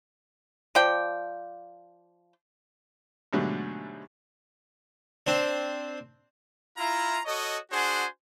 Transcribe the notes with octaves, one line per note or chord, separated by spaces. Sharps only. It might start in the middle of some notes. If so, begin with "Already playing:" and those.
F3 D5 G5
G#2 B2 D3 F#3 G3 A3
C4 D4
E4 F4 A#5
F#4 A4 C#5 D#5
D4 F#4 G#4 C5 F#5 G#5